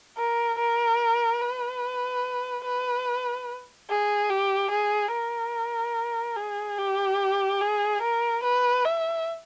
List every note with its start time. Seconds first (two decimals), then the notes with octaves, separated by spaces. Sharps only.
0.18 A#4
0.58 A#4
1.41 B4
2.65 B4
3.89 G#4
4.30 G4
4.71 G#4
5.13 A#4
6.36 G#4
6.78 G4
7.61 G#4
8.02 A#4
8.43 B4
8.84 E5